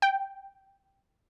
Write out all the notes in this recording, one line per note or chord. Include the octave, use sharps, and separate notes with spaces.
G5